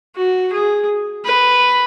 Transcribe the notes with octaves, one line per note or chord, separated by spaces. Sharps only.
F#4
G#4
B4